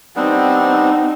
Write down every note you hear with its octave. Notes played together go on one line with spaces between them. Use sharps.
G3 B3 C4 D4 D#4